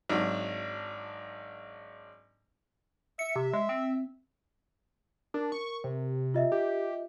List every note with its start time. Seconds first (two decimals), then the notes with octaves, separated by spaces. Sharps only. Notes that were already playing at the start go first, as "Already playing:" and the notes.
0.09 G#1 F#3 D4
3.19 E5 C#7
3.36 C3
3.53 G#3
3.69 C4
5.34 D4 A#4
5.52 C#6
5.84 C3
6.34 F4 D#5 E5
6.52 G4